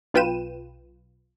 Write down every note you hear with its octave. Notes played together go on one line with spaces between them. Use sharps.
B1 F4 B4 G5 D#7 E7